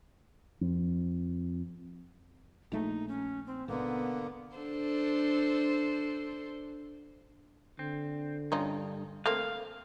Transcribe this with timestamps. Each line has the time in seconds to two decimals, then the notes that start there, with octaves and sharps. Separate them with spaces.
0.61 F2
2.72 A#1 A3 A#3 D#4
3.08 C#4
3.46 C4
3.68 G#1 B2 D3 A#3 B3
4.56 D4 A4 C5
7.79 D3 C4
8.52 G2 C#4 D#4 F4
9.26 A3 A#3 C4 F5